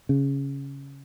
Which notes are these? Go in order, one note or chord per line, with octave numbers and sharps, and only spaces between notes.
C#3